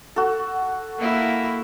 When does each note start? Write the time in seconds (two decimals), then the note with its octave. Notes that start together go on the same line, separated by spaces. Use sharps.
0.16 F#4 A4
0.98 A#3 E4